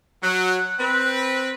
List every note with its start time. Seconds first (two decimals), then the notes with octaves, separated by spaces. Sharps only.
0.23 F#3 F#6
0.79 C4 B4